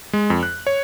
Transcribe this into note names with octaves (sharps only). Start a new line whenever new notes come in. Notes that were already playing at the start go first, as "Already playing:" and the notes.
G#3
F2
F#6
C#5